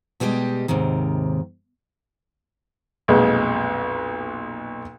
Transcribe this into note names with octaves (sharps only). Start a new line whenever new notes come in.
B2 G3 G#3 G4 D#5
D#2 G#2 C3 D#3
B1 F2 A#2 G#3